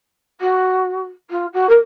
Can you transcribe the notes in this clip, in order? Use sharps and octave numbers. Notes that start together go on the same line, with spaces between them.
F#4
F4
F#4
A#4